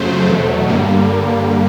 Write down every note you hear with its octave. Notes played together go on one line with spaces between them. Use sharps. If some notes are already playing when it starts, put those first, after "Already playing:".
Already playing: F2 C#3 F#3 A3 C5
E2 B2 F#3 A3
G2 D3 G3 A#3